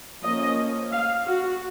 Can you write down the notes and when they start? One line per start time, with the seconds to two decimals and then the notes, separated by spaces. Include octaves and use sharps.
0.23 F3 A#3 C#4 D#5
0.92 F5
1.27 F#4